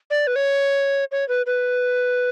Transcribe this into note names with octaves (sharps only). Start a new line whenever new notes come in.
D5
B4
C#5
C#5
B4
B4